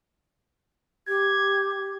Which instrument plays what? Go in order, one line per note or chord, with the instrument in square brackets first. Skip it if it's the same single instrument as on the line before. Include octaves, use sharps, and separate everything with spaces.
[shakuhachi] G4 [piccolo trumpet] G#6